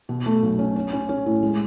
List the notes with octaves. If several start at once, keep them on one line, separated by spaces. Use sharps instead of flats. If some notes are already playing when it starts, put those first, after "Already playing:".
B2
A3
B1
C#4
C#4
C#4
C#4
A2
G#3